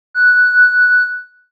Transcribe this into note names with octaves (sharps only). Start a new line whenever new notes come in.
F#6